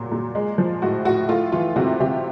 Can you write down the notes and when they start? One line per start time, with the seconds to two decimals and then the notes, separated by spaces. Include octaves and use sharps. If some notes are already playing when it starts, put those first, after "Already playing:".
Already playing: A#2 F#3
0.12 A#2
0.35 G#3
0.58 F3
0.82 A2 F#4
1.05 A2 F#4
1.29 A3 F4
1.52 E3 F4
1.76 C3 F#4
2.00 C3 G4